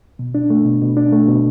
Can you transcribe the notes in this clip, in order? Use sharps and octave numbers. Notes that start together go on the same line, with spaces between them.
B2
D4
A3
B2
B2
D4
A3
B2